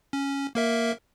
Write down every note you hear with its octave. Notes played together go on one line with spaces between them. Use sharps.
C#4
A#3 A#4 E5